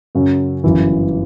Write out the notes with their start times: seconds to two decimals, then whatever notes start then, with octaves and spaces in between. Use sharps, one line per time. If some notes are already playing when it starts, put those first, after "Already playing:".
0.15 F#2 C#3 F#3 C#4
0.64 G1 F#2 E3